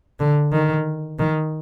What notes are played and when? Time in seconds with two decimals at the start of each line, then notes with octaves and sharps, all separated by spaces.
0.20 D3
0.52 D#3
1.19 D#3